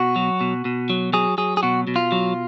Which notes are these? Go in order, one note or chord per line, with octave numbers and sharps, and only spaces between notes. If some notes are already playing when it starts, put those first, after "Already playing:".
Already playing: B2 F#4
F#3
B2
B2
F#3
F#3 G#4
F#3 G#4
G#4
B2 F#4
B2
F4
F#3